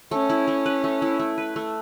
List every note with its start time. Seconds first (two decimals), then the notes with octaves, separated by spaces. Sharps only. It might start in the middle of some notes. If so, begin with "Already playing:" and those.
0.11 A3 C#4
0.30 E4
0.48 A3
0.66 B4
0.84 A3
1.02 E4
1.19 A3
1.38 B4
1.56 A3